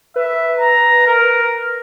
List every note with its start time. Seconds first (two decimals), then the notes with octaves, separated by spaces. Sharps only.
0.16 B4 E5
0.60 A#5
1.07 A#4